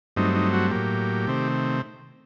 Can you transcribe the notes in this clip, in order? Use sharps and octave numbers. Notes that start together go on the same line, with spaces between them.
G2 F#3 A3 C4 D#4
D#4
F#4
A2 F#3 A#3 G4
C3 D#3 A3 C4